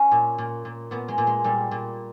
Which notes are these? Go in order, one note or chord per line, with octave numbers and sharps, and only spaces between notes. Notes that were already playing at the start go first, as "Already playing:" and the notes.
Already playing: C#4
A#2
A#2
A#2
A#2 B3
G#3
A#2
G#3
A#2 G3
A#2